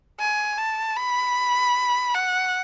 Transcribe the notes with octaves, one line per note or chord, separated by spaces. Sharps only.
G#5
A5
B5
F#5